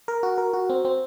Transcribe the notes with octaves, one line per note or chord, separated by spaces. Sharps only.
A#4
F#4
A#4
F#4
C4
C4